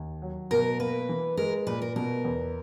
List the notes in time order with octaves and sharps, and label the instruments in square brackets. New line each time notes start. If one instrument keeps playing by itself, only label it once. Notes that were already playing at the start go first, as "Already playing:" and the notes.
Already playing: [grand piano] D#2
F#3
[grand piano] B2 [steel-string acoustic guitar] A#4
[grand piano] A#3 [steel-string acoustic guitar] B4
[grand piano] E3
[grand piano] G#3 [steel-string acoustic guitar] A#4
[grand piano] A#2 [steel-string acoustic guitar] B4
[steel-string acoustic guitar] A#4
[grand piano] B2 [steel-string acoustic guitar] A#4
[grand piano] E2